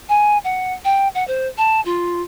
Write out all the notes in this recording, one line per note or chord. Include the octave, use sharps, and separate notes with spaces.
G#5
F#5
G5
F#5
C5
A5
F4